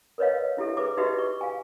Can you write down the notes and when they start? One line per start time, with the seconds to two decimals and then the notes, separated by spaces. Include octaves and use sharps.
0.18 A#4 B4 C#5 D#5 F5
0.57 D4 E4 G4 A4 E5
0.77 G#4 B4 C5 E5 D6
0.97 D#4 F#4 G4 B4 D#5 E5
1.19 C#6
1.41 F5 G#5